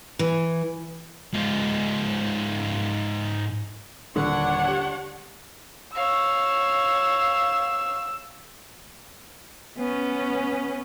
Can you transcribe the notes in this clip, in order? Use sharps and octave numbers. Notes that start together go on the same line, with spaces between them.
E3
G#2 F4
D#1 D3 D4 C#5 F#5
G4
C#5 F5 E6
B3 C#4